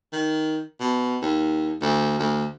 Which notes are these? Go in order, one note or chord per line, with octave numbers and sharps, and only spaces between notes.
D#3
B2
D#2
D2
D2